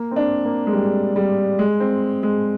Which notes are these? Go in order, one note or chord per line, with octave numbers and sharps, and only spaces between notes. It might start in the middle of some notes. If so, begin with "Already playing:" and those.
Already playing: A#3
C4
D4
A#3
G#3
G3
G3
G#3
C4
G#3